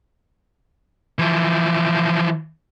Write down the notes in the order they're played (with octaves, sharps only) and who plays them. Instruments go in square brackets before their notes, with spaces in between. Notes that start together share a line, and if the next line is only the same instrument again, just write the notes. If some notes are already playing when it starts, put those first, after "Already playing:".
[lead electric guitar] E3 F3